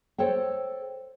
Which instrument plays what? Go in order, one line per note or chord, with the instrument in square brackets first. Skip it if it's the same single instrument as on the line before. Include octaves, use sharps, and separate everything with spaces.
[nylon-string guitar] A4 C5 C#5 G5